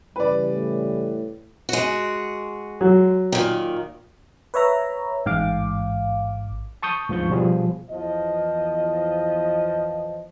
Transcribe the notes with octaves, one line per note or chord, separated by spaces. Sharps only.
C#3 E3 G3 B4 D5
A2
G#3 F#4
F#3
A#2 D#3
B4 C#5 E5 A#5
A1 G#2 F5 D6
A5 C#6 D#6 G6
D2 G#2 F3 C#6 G6
B2 F3 G3 G#4
E2 F3 D#5